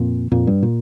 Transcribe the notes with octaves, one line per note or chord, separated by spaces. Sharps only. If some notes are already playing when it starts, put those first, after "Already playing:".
Already playing: F2 A#2
F2 A#2
G2
A#2